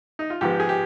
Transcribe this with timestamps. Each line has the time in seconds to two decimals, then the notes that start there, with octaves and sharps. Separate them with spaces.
0.19 D#4
0.30 F4
0.41 G#2 F3 B3 G4
0.60 G#4
0.69 G4